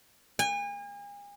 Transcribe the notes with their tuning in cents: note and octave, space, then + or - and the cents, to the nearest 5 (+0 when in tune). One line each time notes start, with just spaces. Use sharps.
G#5 -40